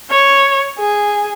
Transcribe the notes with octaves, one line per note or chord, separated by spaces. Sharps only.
C#5
G#4